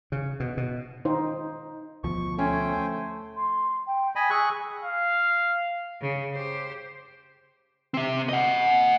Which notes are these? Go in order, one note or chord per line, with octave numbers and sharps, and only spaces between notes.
C#3
B2
B2
D#4 C5
D2 B2 F3 C#6
A3 C#4 C5 G5 G#5
C6
G5
D#5 G#5 B5
G#4 C#6 E6 F#6
F5
C#3
G4 C5
C4 E5
D#5 F#5